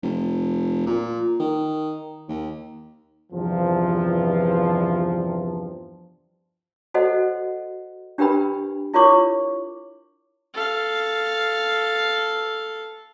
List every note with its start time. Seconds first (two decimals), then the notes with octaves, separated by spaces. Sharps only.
0.03 F1
0.86 A#2
1.40 D#3
2.28 D#2
3.33 E2 G2 C3 F3
6.94 F#4 A4 C5 D#5 F#5
8.18 D4 G4 A#4 B4 G5 B5
8.94 E4 F4 A#4 C#5 C#6 D6
10.54 A4 F5